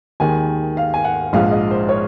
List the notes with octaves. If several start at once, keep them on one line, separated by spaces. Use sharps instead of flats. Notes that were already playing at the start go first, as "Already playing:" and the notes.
D#2 D#3 G#3 G#5
F5
G#5
F#5
A#1 G#2 F3 G#3 F5
D#5
C5
C#5